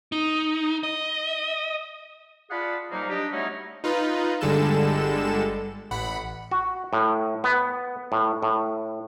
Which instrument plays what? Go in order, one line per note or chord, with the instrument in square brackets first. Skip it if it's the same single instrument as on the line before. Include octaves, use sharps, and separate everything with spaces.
[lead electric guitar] D#4
D#5
[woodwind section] F4 G#4 D5 F#5 A5 B5
G#2 F#3 G3 A#3 D#4
D4 G4 D#5
F#3 G3 A3 C#4 D#4 E4
[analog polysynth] D#4 F4 B4
G1 D3 G3 G#3 A4 E7
A1 F#5 B5
[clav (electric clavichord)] F#4
A2
B3
A2
A2